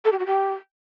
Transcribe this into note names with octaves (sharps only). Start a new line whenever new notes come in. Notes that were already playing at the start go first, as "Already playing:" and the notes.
A4
G4
F#4
G4